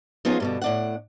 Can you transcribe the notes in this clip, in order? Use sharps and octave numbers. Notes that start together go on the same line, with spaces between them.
F3 B3 C#4 D#4 F4 G#4
G2 B2 D3
A2 D4 F#5